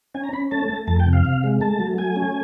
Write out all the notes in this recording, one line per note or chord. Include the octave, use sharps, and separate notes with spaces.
C#4 G#5
A#5
C#4 B5
A3 A5
A3
F2 A5
G5
C3
F5
C3
G#3
A3 A5
F#3
A3 G#5
C#4